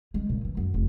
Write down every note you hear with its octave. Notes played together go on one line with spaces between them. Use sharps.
G#3
A#2
E3
F#2
F1